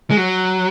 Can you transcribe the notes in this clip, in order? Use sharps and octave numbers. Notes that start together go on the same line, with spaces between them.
G#3
F#3